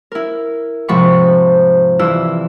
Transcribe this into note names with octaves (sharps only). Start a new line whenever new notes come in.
E4 A#4
G#2 C3 F3 B5 C#6
G2 E3 E4 F4 E6